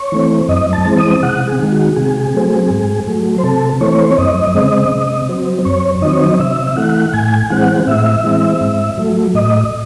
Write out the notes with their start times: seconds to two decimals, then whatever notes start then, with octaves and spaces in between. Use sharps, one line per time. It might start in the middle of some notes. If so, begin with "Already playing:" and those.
Already playing: C#5
0.12 E3 A3 C4
0.48 F#2 D#5
0.73 A5
0.85 E3 G#3 C4
0.98 D#6
1.22 C3 F#5
1.47 G#4
1.59 D#3 G#3
1.72 F#4
1.96 C3 G#4
2.34 F#3 A3 C4
2.70 G#2
3.07 F#3 A3
3.38 C5
3.43 C3 A4
3.80 E3 A3 C4 C#5
4.03 C5
4.11 C#5
4.17 F#2 D#5
4.54 C#3 G#3 C4
4.92 C3
5.29 F#3 C4
5.65 F#2 C#5
6.02 D#3 F#3 C4 D#5
6.12 C#5
6.21 D#5
6.39 C3 E5
6.67 E5
6.76 E3 A3 F#5
7.08 F#5
7.13 A2 G#5
7.50 E3 G#3 C4 F#5
7.87 A2 E5
8.24 E3 G#3 C4
8.61 G#2
8.98 F#3 A3
9.34 A2 D#5